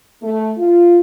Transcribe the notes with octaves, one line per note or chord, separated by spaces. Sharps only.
A3
F4